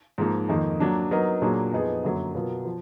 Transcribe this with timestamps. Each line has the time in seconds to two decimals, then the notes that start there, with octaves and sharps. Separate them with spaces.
0.18 G#2 F3 A#3
0.49 F2 D#3 A#3 D#4
0.80 F#3 A#3 D4
1.11 F#3 B3 D#4 A#4 D#5
1.42 A#2 F#3 A#3 D4 G#4
1.72 F2 F3 B3 D#4 G#4
2.04 F#2 D3 F#3 A#3
2.34 B2 F#3 B3 F4 A#4
2.65 F3